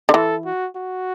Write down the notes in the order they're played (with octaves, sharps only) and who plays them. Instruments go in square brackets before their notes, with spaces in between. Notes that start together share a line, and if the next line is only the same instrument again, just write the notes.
[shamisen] D3
[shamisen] E3 [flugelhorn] A4
[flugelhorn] F#4
F#4